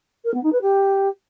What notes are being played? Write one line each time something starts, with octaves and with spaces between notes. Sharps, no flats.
A#4
B3
D#4
B4
G4